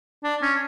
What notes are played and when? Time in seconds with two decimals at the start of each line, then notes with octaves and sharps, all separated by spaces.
0.23 D4
0.42 C#4